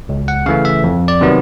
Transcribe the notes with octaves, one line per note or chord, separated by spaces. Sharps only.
C#2
F#5
C#3 E3 A3 F5
E5
F2
D5
C3 D#3 F#3 B3